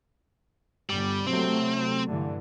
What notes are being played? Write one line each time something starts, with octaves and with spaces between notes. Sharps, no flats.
G1 G3
C3 F#3 A3 C4
G2 D3 E3